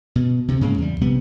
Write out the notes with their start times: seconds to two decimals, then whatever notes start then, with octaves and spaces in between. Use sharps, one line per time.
0.16 B2
0.48 D2 C3
0.61 G#2 C#3 G#3 A#3
0.78 E2 G3
1.01 A#1 C3 G3 B3